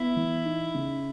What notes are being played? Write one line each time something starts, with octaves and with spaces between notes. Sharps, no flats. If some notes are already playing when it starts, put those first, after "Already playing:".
Already playing: B3 E4
E3
D#4
C#3